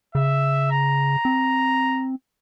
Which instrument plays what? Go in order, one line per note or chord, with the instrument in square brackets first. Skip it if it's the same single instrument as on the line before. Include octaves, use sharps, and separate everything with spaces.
[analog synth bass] C#3 [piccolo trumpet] E5
[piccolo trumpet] A#5
[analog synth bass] C4